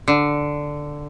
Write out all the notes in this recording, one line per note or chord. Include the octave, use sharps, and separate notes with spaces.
D3